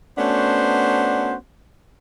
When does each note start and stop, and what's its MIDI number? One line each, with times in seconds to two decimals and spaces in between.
0.18 1.34 57
0.18 1.34 59
0.18 1.34 61
0.18 1.34 62
0.18 1.34 66
0.18 1.34 72